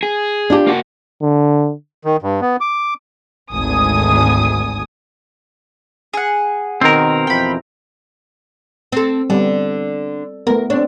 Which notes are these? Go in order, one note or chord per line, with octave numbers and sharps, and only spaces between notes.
G#4
D4 F4 G4
A#3 F#4
D3
D#3
G2
B3
D6
G#1 D2 G#5 D#6
G#4 F#5
B2 D#3 C4 A#4
F2 B2 E3 G5 B5
C4 A4
D3 G3 B3
A3 B3 A#4
C4 D4 C#5